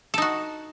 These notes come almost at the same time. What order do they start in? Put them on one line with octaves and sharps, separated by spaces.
A4 D#4 F#4